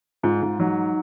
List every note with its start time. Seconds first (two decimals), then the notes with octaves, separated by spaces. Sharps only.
0.23 G#2 F4
0.42 G#2
0.60 F#3 D#4